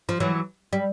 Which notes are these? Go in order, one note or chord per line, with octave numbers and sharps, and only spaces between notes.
F3
E3 F#3
G3